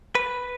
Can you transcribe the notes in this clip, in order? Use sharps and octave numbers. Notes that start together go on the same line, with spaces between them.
B4